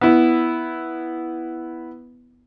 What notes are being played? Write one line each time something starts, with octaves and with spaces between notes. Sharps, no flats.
B3 E4